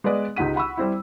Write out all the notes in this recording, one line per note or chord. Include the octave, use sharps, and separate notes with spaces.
G#3 B3 B4 D5 D#5
C#2 D#4 G4 F#5 B6 D#7
F#5 B5 C#6 E6
G3 C4 E4